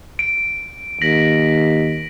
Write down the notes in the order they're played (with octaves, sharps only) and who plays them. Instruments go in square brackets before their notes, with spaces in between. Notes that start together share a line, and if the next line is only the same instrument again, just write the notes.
[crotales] D7
[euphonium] D#2 [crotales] A#6 B6 F#7